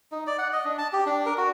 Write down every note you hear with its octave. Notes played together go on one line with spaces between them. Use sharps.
D#4
D5
F#5
D#5
D4
A5
G4
D4
A#4
F#4